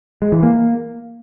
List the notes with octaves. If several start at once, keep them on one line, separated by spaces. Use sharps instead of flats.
G#3
E3
A#3